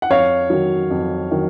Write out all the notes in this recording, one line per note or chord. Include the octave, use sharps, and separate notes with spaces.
F#5
F2 C#5 F5
D#3 F#3
F2
D#3 F#3